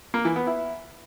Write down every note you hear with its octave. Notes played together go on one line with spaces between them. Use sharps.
A#3
E3
B3
E4